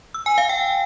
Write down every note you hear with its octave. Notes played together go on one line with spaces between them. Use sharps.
E6
G#5
F5
G5